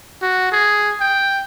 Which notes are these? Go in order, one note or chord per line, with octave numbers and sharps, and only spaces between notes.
F#4
G#4
G5